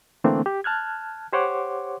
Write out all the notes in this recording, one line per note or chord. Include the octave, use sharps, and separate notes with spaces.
D3 E3 A3 A#3 C4 D4
G4
A5 F6 F#6 G#6
G4 C5 C#5 F#5 C6 D6